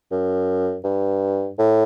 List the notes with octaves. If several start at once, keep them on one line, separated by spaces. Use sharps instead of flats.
F#2
G2
A2